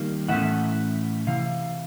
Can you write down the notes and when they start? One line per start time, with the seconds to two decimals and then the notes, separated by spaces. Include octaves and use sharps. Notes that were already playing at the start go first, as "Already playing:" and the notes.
Already playing: D#3 G3 A#3
0.28 A2 E3 A3 C#4 E5 F#5
1.27 C3 E3 F5